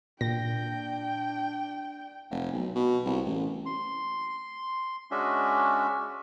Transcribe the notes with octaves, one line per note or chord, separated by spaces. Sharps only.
A#2 D4 G5 A#6
F1
B1
B2
C2
A1
C6
G#3 C#4 D4 F#4 E5